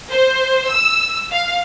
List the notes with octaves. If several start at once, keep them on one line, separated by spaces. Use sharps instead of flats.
C5
E6
F5